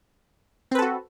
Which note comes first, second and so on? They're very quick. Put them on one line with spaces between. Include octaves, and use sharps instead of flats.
C4 B4 A4 F#4